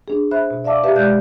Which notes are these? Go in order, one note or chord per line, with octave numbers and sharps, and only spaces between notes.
D4 G#4
C5 E5 B5 F#6
B2
D5 E5 F5 A5 D6 E6
G4 B4 E5 F5 A5
B2 G#3 D5 F#6 G6